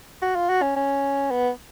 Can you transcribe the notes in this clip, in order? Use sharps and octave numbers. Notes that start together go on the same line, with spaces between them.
F#4
F4
F#4
C#4
C#4
B3